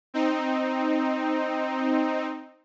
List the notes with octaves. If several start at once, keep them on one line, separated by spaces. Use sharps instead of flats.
C4 D#4